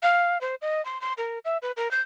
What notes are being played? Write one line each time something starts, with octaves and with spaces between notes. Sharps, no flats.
F5
C5
D#5
C6
C6
A#4
E5
B4
A#4
G6